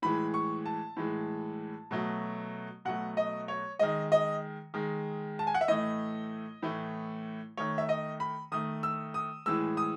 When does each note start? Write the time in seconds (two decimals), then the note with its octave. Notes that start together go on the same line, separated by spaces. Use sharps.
0.02 A2 E3 G#3 B5
0.34 C#6
0.66 A5
0.97 A2 E3 G#3
1.91 B2 F#3 A3
2.85 B2 F#3 A3 F#5
3.17 D#5
3.48 C#5
3.79 D#3 G#3 D#5
4.12 D#5
4.74 D#3 G#3
5.39 A5
5.47 G#5
5.54 F#5
5.61 E5
5.68 A2 E3 A3 D#5
6.62 A2 E3 A3
7.57 D#3 A3 C#5
7.78 E5
7.89 D#5
8.20 B5
8.52 D#3 A3 D#6
8.83 E6
9.14 D#6
9.46 A2 E3 G#3 E6
9.77 D#6